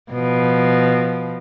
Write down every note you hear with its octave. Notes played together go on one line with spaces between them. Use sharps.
B2 F3